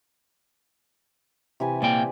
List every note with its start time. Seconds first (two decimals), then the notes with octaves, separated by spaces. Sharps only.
1.60 C3 E3 G#5
1.82 A#2 A#3 D5 G5